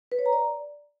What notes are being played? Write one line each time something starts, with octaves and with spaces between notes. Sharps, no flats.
B4
C#5
A#5
D5